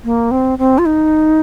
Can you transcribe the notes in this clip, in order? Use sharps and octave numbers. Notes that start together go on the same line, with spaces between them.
A#3
C4
C4
F4
D#4